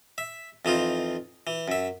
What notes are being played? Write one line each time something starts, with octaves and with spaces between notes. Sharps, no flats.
E5
F2 E3 D#4 F4
E3
F#2 E5